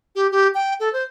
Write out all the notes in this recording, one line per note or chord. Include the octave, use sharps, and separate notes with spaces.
G4
G4
G5
A4
C5